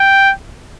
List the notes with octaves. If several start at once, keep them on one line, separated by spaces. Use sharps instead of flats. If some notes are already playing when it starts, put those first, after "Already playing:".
Already playing: G5